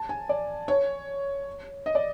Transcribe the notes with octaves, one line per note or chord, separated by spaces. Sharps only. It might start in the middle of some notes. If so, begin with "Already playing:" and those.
Already playing: A5
G#5
D5
C#5
D#5
D5